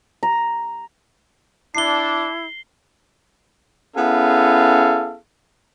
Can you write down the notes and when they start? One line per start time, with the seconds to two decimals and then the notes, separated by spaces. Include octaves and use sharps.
0.23 A#5
1.75 D4 E4 C7 G7
3.96 B3 C#4 E4 G#4 A4 F5